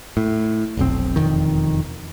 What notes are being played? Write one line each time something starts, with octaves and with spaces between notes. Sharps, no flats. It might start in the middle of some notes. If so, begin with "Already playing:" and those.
A2
F1 B1 C4
E1 C2 F2 D#3